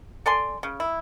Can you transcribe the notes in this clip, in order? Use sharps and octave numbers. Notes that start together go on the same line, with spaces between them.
A4 D5 G#5 C6
C#3
E4